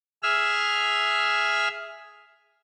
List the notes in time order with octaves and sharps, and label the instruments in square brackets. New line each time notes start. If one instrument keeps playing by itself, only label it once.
[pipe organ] G#4 E5 E6 F6